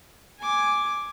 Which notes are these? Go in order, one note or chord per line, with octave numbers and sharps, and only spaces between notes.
G#5 D6